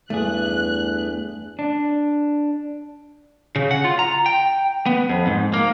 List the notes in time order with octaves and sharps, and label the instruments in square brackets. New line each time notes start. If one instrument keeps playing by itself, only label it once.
[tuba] E2 [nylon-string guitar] G2 [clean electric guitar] A3 G#4 [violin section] F#6
[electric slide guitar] D4
[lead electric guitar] C#3
F#5
F4
A#5
G5
B3
F2
G#2
A#3